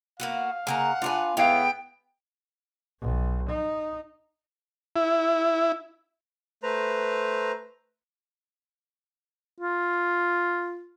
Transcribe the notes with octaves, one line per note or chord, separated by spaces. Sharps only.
A#3 B3 F#4 F5
C#3 A#3 F#5 G#5 A#5
D4 F4 F#4 B4 G#5
A2 G#3 B3 E4 C#5 F5 G5
B1
D#4
E4
A3 B4 C5 A#5
F4